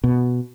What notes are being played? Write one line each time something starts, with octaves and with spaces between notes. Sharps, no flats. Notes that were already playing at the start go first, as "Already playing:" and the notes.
B2